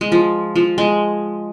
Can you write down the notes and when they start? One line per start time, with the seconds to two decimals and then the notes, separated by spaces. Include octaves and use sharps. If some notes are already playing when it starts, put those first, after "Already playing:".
0.01 G#3
0.12 F3
0.55 F3
0.78 G#3